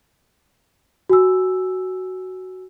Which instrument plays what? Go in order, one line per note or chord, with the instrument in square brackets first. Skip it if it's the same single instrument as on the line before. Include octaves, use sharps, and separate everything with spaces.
[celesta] F#4 G#5 E6